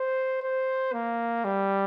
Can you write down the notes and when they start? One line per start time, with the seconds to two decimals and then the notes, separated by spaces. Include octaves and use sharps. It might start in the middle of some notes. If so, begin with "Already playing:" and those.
Already playing: C5
0.42 C5
0.93 A#3
1.45 G3